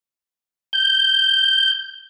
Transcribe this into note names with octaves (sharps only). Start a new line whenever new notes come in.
G6